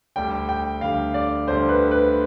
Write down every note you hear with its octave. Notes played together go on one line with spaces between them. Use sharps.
D2 D3 G3 G5
G5
D2 D3 G3 F5
D5
D2 D3 G3 C5
B4
B4